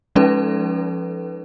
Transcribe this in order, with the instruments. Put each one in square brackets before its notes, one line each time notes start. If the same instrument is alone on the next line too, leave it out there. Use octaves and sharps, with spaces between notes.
[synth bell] F3 G#3 C#4 D#4 A4 B4